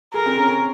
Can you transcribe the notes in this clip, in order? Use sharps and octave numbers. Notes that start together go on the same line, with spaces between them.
G#4 A#4
C4
C#4
C#4